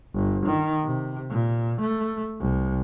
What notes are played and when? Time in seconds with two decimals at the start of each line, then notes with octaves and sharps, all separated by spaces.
0.14 G1
0.47 D#3
0.84 C3
1.30 A#2
1.82 A3
2.40 C2